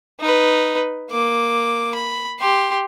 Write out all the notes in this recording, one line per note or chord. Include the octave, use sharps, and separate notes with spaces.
D#4 B4
A#3 D6
B5
G4 C6